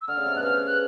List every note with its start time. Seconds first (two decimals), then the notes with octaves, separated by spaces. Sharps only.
0.02 E6
0.08 D3 F6
0.17 C#3
0.26 C3
0.35 B2 F#6
0.43 C#3 F6
0.67 F#6